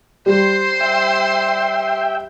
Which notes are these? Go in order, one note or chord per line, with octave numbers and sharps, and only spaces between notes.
G3 C5 C6
E5 G5